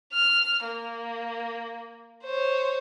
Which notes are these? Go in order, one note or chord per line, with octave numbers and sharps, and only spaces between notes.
F6
A#3
C5 C#5